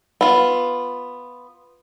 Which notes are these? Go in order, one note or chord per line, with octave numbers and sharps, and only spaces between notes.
B3 F4